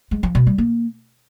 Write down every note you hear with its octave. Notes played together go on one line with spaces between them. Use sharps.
G#3
F3
B2
G3
A#3